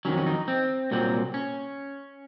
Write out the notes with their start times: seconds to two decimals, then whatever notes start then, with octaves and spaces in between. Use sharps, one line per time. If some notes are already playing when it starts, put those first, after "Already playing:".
0.05 F2 D#3 F#3 C#4
0.18 C#4
0.26 D#4
0.48 C4
0.91 C2 A#2 F#3 C4
1.34 C#4